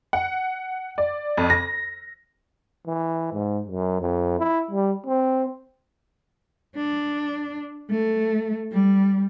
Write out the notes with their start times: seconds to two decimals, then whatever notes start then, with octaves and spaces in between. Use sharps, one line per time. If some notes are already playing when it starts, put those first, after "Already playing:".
0.13 F#5
0.98 D5
1.37 F2
1.50 A#6
2.87 E3
3.33 G#2
3.68 F#2
4.01 F2
4.39 E4
4.71 G3
5.06 C4
6.76 D4
7.90 A3
8.72 G3